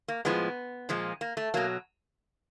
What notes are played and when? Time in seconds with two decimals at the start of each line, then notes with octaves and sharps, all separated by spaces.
0.08 A#3
0.25 A2 F3 G#3 B3
0.89 A#2 F3 G#3
1.21 A#3
1.37 A3
1.54 B2 F#3 A#3